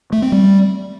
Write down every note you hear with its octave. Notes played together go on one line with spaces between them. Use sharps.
A3
C4
G3